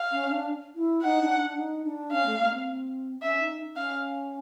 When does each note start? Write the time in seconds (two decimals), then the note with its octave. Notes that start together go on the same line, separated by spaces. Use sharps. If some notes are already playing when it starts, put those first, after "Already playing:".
Already playing: F5
0.12 C#4
0.30 D4
0.76 E4
1.03 D#4 F#5
1.22 D4
1.40 D4
1.57 D#4
1.85 D4
2.12 C#4 F5
2.26 A3
2.40 A#3
2.53 C4
3.22 C#4 E5
3.40 D#4
3.76 C#4 F5